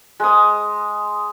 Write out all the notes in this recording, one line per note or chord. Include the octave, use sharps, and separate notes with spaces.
G#3 D#6